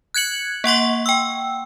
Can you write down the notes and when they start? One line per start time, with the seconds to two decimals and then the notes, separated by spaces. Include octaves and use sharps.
0.14 F#6 G#6 C#7 F#7
0.64 A#3 F#5 C6 C#6
1.06 G5 E6